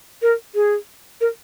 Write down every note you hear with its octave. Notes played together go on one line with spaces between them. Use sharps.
A#4
G#4
A#4